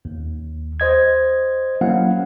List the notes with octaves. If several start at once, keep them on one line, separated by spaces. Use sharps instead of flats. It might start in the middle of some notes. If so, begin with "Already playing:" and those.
D#2
C5 D#5 G#6
F#3 A#3 C#4 E4 F5 F#5